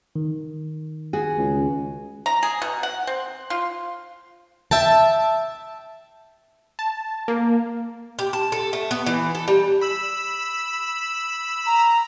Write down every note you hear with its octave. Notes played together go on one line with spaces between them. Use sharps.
D#3
F#4 G#4
C#2
A#5
G#4
B2
F#5
C4
F4
E5 G5 A5
A5
A#3
G4
A5
A4
A3
B3
E3
A4
G3
B5 E6
A#5